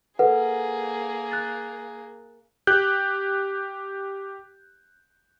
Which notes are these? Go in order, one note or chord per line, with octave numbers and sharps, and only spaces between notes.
A#3 G#4 A4 B4 F#5
F#6 A6
G4 F#6 G6